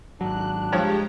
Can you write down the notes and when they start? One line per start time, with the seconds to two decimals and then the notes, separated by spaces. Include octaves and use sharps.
0.21 G#1 F#3 D4 F#6
0.72 G2 F3 G#3 G4 C#5 A#5